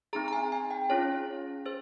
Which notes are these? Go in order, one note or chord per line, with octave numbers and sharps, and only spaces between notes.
C4 D#4 G#4 A#5
A#5
G#5
G#5
G5
C#4 F4 G#4 C#5
G#4 C5